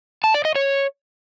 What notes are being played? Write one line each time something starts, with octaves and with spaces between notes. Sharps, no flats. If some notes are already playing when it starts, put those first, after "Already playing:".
A5
D5
D#5
C#5